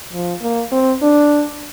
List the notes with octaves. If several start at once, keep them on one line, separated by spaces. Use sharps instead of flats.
F3
A#3
C4
D4